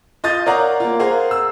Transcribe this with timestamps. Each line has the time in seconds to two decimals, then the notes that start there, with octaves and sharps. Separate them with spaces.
0.24 F4 D#5 D#6 G6 A6
0.46 A#4 C#5 D5 F5 F#5 A#5
0.80 A#3 F4
1.00 G#4 A#4 C5 F5 F#5
1.31 E6